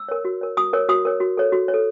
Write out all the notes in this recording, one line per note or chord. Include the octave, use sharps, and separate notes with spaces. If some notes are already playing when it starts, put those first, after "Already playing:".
Already playing: E6
A#4 C#5
F#4
A#4 C#5
F#4 D#6
A#4 C#5
F#4 D#6
A#4 C#5
F#4
A4 C#5
F#4
C#5
A4